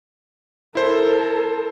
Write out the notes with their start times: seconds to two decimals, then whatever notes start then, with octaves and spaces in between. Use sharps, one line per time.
0.75 E4 A4 A#4 C5